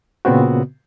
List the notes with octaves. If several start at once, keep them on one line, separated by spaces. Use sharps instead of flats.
A#2 C#3 B3 C4 F#4